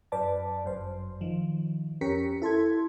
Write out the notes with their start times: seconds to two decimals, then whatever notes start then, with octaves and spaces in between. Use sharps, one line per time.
0.12 F#2 B4 D5 A5
0.64 G1 F#2 C5
1.21 D#3 F3
2.01 F2 C#4 G4 A#4 B6 C#7
2.42 E4 A4 C6 G#6